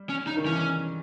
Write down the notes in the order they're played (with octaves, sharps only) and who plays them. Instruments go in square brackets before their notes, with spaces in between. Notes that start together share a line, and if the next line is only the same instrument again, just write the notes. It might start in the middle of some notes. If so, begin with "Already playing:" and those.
Already playing: [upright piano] G3
[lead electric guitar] C#4
[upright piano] C#3 [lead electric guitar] D#4
[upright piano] D#3
[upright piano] E3 [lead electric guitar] C#4